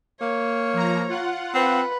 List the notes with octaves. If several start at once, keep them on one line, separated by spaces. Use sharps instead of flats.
A#3 C#5
F3 A#5
F4 F#5
C4 B4